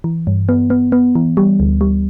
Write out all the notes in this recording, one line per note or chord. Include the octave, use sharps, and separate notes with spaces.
E3
G2
B3
B3
B3
E3
G3
D2
G3